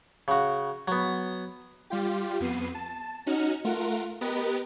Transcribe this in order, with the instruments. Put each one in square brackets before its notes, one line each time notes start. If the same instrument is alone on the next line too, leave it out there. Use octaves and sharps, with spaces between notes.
[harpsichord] C#3 F#4
F#3 B3
[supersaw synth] G3 F4 G4
F2 B3 C7 D#7
A5
C#4 D#4 F#4 F6
A3 F4 A#4 F#5
B3 G4 A#4 B4 D#5